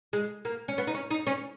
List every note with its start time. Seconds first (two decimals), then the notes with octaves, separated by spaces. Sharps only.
0.13 G#3
0.45 A#3
0.68 C#4
0.78 B3
0.87 D#4
0.94 C#4
1.11 D#4
1.27 C#4